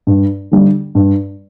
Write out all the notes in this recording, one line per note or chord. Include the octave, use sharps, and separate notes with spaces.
G2
D3 G3
G2